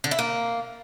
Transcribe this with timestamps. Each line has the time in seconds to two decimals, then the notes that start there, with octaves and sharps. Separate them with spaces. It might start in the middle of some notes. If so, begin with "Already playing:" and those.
0.04 D3
0.11 E4
0.19 A#3